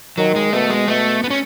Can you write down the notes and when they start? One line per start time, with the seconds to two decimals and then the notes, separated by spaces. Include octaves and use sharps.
0.18 D#3 F#3
0.36 G#3
0.53 B2 A3
0.70 G#3
0.88 B2 A3
1.24 B3
1.30 C#4